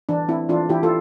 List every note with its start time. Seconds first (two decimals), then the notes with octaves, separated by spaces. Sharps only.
0.09 E3 D4
0.28 C4 E4
0.49 E3 D4 F4
0.69 E3 E4 G4
0.83 F4 A4